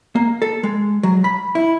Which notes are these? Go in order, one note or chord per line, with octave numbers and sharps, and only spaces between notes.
A#3
A4
G#3
F#3
B5
E4